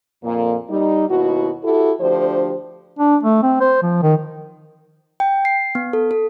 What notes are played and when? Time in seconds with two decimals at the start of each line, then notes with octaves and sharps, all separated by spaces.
0.22 F2 A#2 A#3
0.69 G3 D#4
1.09 D#2 B2 E4 F#4
1.62 E4 F#4 G4 A4
1.99 D2 F3 D4 G4 C5
2.99 D4
3.23 A3
3.43 C4
3.60 C5
3.82 F3
4.02 D#3
5.20 G5
5.45 C7
5.75 B3
5.93 A4
6.11 A4